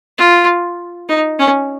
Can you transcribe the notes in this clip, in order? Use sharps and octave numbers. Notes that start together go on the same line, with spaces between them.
F4
D#4
C#4